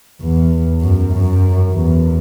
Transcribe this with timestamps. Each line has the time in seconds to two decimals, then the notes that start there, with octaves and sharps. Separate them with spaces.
0.21 E2
0.81 F#2
1.12 F#2
1.72 E2